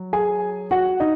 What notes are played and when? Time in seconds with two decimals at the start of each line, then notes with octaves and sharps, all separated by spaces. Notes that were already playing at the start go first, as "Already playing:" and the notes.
Already playing: F#3
0.13 G#4 G#5
0.71 F#4 F#5
1.00 D#4 D#5